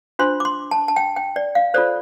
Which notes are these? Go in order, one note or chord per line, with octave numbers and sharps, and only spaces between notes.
D4 F4 C5 C6
D6
C6
A5
A5
G5
G5
D5
F5
F4 A4 C5 D5